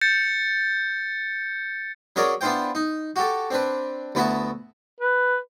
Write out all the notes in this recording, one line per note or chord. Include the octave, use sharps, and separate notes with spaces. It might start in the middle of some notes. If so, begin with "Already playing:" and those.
G6 A6 C#7
F#3 C#4 G#4 A#4 C#5 D5
B3 D4 E4 F4 C5 G5
D#4
F#4 G4 A4
C4 D4 B4
D2 B3 E4 F#4 E5 A5
B4